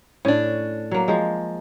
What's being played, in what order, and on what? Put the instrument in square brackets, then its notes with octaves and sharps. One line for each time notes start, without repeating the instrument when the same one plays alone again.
[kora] A2 [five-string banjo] C#4 D4
[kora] F#3 A#3
F3 G#3